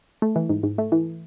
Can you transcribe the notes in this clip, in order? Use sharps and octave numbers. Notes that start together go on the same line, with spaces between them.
A3
E3
G#2
G#2
A3
E3